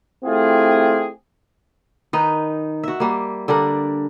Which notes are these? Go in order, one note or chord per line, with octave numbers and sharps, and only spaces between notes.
A3 C4 E4 F4 G4 G#4
D#3 D#4 B4
F#4 E5
G3 A#3
D3 G3 D4 A#4